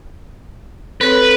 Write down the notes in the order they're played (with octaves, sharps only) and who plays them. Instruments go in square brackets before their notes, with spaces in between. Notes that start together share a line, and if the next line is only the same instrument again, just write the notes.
[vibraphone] C4 A4 C#5 [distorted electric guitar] B4